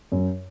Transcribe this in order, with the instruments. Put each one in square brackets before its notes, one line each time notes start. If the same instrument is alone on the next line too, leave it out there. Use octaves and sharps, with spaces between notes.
[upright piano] F#2